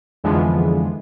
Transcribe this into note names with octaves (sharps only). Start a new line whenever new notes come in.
F2 D3 E3 F3 G#3 B3